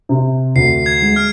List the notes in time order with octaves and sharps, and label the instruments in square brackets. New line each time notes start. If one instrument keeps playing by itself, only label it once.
[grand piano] C3
[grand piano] D2 [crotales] C7
[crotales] G#6
[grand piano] G#3
[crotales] F6